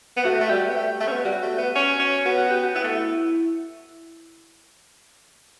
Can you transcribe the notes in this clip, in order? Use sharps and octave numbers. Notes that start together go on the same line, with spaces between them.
B3
A3 F#4
A3
G3 G4
B3
A3
A3
C#4
B3
G3 F#4
A3
B3
C#4
C#4
B3 F#4
F#4
G4
F#4
B3 E4
A3